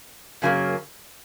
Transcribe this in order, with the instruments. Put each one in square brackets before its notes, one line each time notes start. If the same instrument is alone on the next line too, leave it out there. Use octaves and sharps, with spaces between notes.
[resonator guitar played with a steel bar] F#2 C#3 F#3 A#3